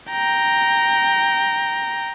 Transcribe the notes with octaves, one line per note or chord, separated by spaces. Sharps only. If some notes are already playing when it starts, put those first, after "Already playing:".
G5 A#5